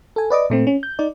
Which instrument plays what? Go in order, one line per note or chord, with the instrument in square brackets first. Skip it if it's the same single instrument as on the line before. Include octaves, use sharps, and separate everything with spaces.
[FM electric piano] A4 G#5
B4 D5 D#5 D6
A#2 A3 C4
C#4
G6
D#4 D5